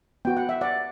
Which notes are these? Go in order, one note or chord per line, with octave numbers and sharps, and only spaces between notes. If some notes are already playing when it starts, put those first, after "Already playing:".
B3 F#4 G5
F#5
E5
D5 F#5